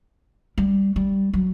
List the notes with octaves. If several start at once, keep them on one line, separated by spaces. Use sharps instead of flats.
G3
G3
F#3